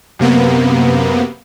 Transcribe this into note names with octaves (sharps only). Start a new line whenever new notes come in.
F#2 C3 A#3 B3